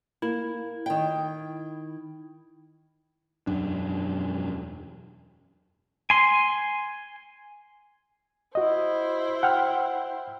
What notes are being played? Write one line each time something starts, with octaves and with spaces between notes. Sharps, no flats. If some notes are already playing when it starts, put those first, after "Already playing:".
A#3 E4
D#3 G5
E1 F#2 D4
G#5 C6
E4 F#4 C5 D#5
F#5 G5 F6